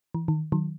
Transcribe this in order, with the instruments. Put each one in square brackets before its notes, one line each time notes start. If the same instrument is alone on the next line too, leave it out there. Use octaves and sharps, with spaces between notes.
[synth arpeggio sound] E3
D#3
D#3 F#3